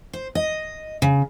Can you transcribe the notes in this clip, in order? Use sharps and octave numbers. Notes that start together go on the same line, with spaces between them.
C5
D#5
C#3